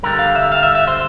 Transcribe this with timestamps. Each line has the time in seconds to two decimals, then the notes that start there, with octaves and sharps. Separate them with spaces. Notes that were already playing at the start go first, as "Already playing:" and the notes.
0.03 G2 D3 G3 A#4
0.19 F5
0.35 E5
0.52 F5
0.63 E5
0.75 E5
0.88 C5